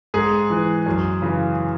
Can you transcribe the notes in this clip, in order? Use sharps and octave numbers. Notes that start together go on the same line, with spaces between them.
G#2 G#4
E3
F#2
C#3 E3